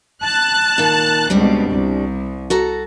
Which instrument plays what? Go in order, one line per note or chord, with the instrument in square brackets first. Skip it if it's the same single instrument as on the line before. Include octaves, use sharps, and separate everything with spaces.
[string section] A5 F#6 A6
[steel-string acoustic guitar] A#2 D#3
[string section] C#2 B2 [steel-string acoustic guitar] G3 C4 D4
[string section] C2
[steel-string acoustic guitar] F#4 A4 A#5